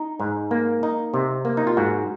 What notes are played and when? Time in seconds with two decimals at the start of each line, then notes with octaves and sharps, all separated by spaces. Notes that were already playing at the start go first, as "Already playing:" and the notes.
Already playing: D#4
0.20 G#2
0.51 A#3
0.83 D#4
1.14 C3
1.45 A#3
1.57 D#4
1.67 F4
1.77 G#2 F#4